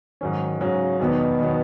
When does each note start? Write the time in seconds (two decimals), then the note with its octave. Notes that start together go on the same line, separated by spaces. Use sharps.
0.21 G#2 D#3 F#3 C#4
0.60 G#2 C#3 F#3 C#4
0.99 E2 B2 D#3 F#3 B3
1.40 D#3 F#3 B3